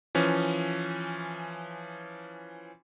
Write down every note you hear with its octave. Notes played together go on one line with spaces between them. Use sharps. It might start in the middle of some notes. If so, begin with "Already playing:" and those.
E3 F3 C#4